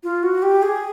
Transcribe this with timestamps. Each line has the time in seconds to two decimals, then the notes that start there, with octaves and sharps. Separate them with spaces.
0.03 F4
0.23 F#4
0.42 G4
0.62 G#4